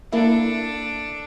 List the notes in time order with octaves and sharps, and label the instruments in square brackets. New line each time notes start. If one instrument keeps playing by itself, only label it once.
[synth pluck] A#3 E4 [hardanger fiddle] D4 A4